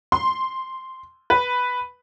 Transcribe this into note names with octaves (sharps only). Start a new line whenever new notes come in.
C6
B4